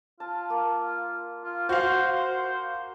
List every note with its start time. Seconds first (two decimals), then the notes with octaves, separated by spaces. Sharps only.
0.20 F4 A5
0.50 A#3
1.44 F4
1.69 F#4 C5 F5